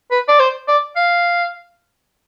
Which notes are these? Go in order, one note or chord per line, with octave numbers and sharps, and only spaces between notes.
B4
D5
C5
D5
F5